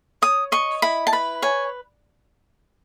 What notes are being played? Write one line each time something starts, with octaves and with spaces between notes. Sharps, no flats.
C#5 D#6
D#5 C#6
E4 B5
A5
B4 B5
C#5 G#5